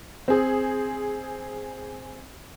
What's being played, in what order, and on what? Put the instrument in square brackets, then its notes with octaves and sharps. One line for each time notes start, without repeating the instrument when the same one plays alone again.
[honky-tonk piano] C4 G#4